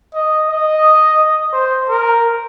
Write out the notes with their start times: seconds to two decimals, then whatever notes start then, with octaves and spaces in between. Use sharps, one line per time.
0.14 D#5
0.49 D#5
1.53 C5
1.89 A#4